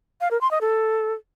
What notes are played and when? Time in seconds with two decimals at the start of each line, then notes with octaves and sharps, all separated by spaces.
0.21 F5
0.31 A#4
0.41 C6
0.51 D#5
0.61 A4